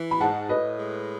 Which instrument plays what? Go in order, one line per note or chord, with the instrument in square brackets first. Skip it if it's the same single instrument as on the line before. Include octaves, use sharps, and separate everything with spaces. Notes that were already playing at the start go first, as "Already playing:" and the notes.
Already playing: [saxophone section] E3
[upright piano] B5
[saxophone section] G#2 [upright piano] F#5 A5
[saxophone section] A2 [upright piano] B4 D#5
[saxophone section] G#3